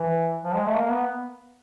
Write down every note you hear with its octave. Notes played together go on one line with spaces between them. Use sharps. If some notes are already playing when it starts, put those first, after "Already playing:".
Already playing: E3
F3
G#3
A3
A#3
B3